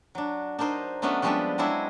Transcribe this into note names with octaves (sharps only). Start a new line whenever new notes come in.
F#3 D4
D4 D#4 A#4 C5 D#5
F#3 A3 B3 C#4 D4 F#4
F3 G3 G#3 B3 C4 D4
F#3 G#3 C4 D4 E4 G#4